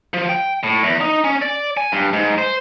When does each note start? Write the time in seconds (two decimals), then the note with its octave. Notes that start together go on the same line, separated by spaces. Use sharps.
0.14 F3
0.29 G5
0.63 A2
0.83 E2
1.01 D#4
1.24 C#4
1.42 D5
1.77 G#5
1.92 G2
2.13 G#2
2.38 C5